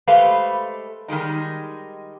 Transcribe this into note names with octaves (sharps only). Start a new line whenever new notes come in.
G#3 A3 G4 B4 C5 F5
D#3 G3 G#3 D#4